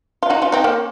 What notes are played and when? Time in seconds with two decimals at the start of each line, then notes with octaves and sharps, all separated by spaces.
0.23 F4
0.30 D#4 F#4
0.42 C#4 F4
0.52 C4 D#4
0.64 A#3 C#4